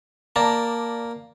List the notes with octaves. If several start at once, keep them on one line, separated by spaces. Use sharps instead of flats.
A#3 D5 A5 A#5